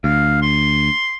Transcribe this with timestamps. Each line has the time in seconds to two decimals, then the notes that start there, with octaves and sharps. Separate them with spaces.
0.04 D2 F5
0.42 C6